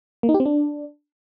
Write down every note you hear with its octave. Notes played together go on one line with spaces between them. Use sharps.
A#3
D#4
G4
C4
D4